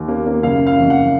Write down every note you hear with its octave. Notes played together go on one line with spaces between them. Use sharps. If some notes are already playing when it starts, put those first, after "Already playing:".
Already playing: D#2 D#3
A#3
A#3
F#1 F5
F#1
F5
F2
F#5